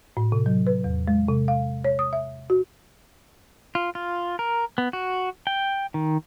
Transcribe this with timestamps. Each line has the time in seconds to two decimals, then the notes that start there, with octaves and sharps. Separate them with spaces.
0.17 A2
0.32 C3
0.46 F#3
0.67 B4
0.84 E2
1.08 G#3
1.28 C3
1.48 F5
1.84 C#5
1.99 D#6
2.13 E5
2.50 F#4
3.75 F4
3.95 F4
4.39 A#4
4.78 B3
4.93 F#4
5.47 G5
5.94 D#3